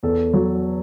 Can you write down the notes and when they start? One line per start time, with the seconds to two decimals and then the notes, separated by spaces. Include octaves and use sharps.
0.03 E2 A4
0.34 F#3